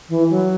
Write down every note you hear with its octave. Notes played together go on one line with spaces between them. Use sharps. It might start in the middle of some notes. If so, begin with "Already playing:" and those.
E3
F#3